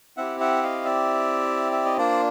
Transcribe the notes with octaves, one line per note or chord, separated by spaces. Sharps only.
C4 E4 G4 E5 F#5
E5 F#5
D#5 F5
D5 E5
E5
D#5
A#3 D4 F4 C5 D5